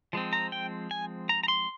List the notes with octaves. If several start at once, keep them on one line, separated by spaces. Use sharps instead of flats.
F3 G#3 C4
A#5
G5
G#5
A#5
A#5
C6